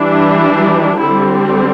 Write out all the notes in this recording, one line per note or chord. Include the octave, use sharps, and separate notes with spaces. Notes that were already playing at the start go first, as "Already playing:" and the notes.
Already playing: E3 G3 D4
D3 G3 C4 E4